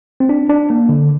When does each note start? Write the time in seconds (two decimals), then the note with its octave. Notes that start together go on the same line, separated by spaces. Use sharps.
0.20 C4
0.29 D4
0.49 D4
0.70 A#3
0.89 D3